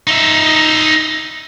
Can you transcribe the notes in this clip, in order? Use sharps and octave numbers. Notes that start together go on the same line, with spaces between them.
D#4 E5